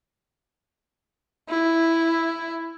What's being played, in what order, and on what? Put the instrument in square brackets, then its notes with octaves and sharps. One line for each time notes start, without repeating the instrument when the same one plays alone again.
[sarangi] E4